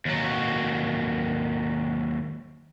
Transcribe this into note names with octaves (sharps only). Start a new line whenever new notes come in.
D#2 F#3